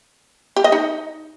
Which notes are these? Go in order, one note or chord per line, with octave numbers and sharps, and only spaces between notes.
G4
D#5
D#4